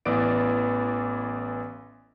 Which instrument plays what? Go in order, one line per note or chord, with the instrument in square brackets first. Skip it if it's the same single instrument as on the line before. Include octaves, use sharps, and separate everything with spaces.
[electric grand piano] A1 E3 B3 D5 D7